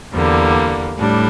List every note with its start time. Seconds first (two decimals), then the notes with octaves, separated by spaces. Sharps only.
0.13 E2 D3 G3 A#3
0.99 A2 G3 D4